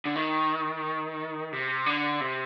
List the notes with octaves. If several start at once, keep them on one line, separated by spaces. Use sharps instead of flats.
D3
D#3
C3
D3
C3